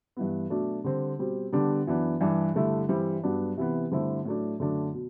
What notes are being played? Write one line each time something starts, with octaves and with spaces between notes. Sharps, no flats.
G2 E3 B3
B2 F#3 A3 D4
D3 G3 C4
B2 G3 C4
D3 G3 B3 D4
F#2 E3 B3 D4
G2 E3 G3 D4
G2 D3 A3 E4
G2 E3 G3 C4 E4
G2 F#3 B3 D4
C3 E3 B3
G2 D3 A3 C4 E4
A2 F#3 A3 D4
F#2 D3 A3 D4
B2